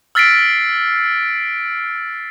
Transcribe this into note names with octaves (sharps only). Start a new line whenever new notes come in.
E6 F6 A6 B6 C7 D7